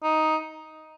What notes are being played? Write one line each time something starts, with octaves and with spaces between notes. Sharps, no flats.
D#4